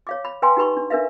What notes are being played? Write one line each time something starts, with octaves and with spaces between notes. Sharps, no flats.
C#5 F5 D6
B5
B4 F5 G5 G#5 A#5 C6
D#4 G4 B4 B5 C#6
D4
D4 A#4 B4 E5 F5